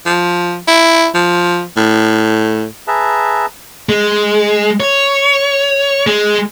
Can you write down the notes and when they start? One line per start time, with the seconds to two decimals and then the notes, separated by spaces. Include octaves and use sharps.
0.06 F3
0.67 E4
1.15 F3
1.77 A2
2.88 G#4 B4 E5 A5 A#5
3.89 G#3
4.80 C#5
6.07 G#3